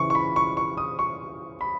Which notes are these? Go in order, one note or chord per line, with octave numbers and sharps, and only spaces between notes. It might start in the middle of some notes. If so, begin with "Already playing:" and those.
Already playing: C#3 E3 C#6
C#6
B5
C#6
C#6
D#6
C#6
B5